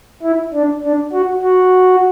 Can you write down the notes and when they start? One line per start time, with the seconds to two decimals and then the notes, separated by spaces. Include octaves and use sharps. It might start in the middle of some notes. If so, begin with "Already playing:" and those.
0.23 E4
0.53 D4
0.83 D4
1.13 F#4
1.42 F#4